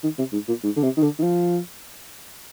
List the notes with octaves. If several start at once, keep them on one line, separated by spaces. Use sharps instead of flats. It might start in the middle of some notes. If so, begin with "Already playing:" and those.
D#3
C3
G#2
A#2
G#2
D3
C3
D#3
D3
D#3
F3